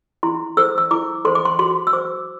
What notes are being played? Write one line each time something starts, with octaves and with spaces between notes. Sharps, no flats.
E4 C6
A4 C5 E6
E6
E4 D6
A4 C5 C6
D6
C6
F#4 C6
E6
C5 D6